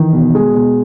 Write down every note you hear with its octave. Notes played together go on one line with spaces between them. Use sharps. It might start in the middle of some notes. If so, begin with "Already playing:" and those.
Already playing: D#3 E3
B2
G#3
B2